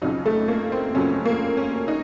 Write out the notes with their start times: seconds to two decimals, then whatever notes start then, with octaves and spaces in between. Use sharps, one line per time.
0.02 F2 C#3 F#3 D#4
0.26 A3
0.48 A#3
0.72 C4
0.95 F2 C#3 F#3 C#4
1.25 A#3
1.57 C#4
1.88 D#4